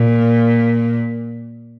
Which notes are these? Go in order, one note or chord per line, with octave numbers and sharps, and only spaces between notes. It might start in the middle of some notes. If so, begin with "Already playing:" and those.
Already playing: A#2